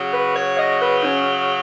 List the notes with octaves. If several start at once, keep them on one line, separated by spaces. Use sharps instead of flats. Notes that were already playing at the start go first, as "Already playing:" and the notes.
Already playing: C#3 F#3
B4
C#5
F5
D#5
B4
D#4
C#4